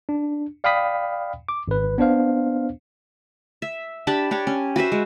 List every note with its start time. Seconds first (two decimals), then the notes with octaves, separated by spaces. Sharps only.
0.09 D4
0.64 D5 F5 G5 B5 D#6 B6
1.49 D6
1.68 G#1 B4
1.98 B3 D4 C5 F5
3.62 E5
4.07 D4 G4 A5 B5
4.31 D4 G4 C#5
4.47 C#4
4.76 F#4 B4 C5 E5
4.92 G#3